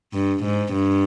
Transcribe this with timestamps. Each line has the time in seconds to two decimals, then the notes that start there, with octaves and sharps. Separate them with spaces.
0.13 G2
0.44 G#2
0.74 G2